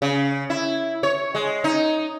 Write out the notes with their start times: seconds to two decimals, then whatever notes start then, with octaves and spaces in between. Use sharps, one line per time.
0.02 C#3
0.50 E4
1.03 C#5
1.35 G#3
1.64 D#4